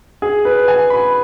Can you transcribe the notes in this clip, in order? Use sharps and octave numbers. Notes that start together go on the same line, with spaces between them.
G#4
B4
G#5
B5